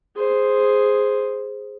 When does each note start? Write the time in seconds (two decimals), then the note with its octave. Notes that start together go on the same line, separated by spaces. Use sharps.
0.16 G#4 C5